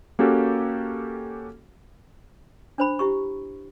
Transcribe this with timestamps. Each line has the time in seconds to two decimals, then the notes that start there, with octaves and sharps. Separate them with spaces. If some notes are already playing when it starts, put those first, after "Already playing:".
0.19 A#3 C#4 F#4 G4 A4
2.78 D4 C5 B5
2.99 E4 G4 C#6